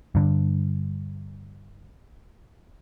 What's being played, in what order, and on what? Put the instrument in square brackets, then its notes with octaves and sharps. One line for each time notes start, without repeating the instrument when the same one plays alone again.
[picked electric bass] G2 D3